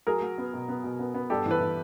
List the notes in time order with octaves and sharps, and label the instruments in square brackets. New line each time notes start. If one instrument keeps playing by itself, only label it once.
[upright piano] F#3 [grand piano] G#4 A#4
[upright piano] F#3
B3
B2
B3
B2
B3
B3
[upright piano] G2 [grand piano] G4 A4
[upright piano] E3 [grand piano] A4 B4
[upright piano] E3